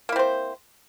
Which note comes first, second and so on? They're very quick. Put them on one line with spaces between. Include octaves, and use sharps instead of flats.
A#3 E4 C4 C5